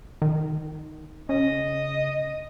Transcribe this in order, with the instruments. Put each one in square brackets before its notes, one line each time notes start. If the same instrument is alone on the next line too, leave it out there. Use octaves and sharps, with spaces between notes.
[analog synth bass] D#3
[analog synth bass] C#3 [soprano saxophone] D#5